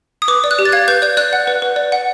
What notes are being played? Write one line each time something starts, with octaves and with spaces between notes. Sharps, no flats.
D#6
B4 D6
D5
F#6
G4
A6
F5 G#6
B4 G6
D5 G6
D5 F#6
F#5
B4
B4
D5
F#5